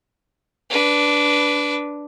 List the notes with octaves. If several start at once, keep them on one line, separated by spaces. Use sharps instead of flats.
D4 B4